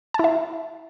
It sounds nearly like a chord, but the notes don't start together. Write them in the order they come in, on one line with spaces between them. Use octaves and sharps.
A5 E4 E5